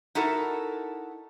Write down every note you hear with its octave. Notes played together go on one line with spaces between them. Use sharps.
D#4 E4 F#4 A4 A#4